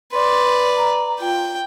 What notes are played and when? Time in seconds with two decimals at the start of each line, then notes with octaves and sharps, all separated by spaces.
0.12 B4 D5 C6
0.77 A#5
1.20 F4 G5